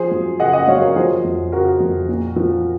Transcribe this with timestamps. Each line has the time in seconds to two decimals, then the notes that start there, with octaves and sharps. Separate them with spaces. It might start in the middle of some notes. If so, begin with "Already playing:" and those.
Already playing: F3 G#4 C5
0.11 F#2
0.40 C#3 D#5 F#5
0.53 D#5 F#5
0.68 F#2 C#5 F5
0.81 A#4 C#5
0.96 F3 G#4 C5
1.25 F2
1.52 C#3 F#4 A#4
1.80 F2
2.09 A#2
2.36 F3